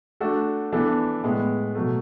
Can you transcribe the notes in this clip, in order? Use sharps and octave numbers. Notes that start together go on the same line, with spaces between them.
A3 D4 F#4 A4
E3 B3 D4 A4
A2 G#3 B3
B2 F#3 A3